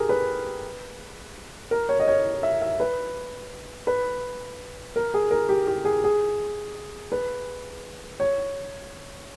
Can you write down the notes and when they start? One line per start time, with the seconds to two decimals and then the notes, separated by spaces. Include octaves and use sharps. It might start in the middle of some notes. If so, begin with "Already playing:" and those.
Already playing: G4 G#4 A#4
0.09 B4
1.71 A#4
1.89 C#5
2.00 D#5
2.08 C#5
2.43 E5
2.62 E5
2.80 B4
3.87 B4
4.96 A#4
5.14 G#4
5.31 A#4
5.49 G4
5.67 G4
5.85 G#4
6.04 G#4
7.12 B4
8.20 C#5